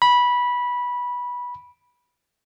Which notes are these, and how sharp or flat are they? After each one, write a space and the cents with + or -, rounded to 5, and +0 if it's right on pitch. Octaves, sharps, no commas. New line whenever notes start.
B5 -15